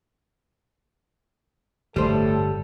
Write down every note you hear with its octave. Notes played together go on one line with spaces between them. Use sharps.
G1 A2 G3 A4 C5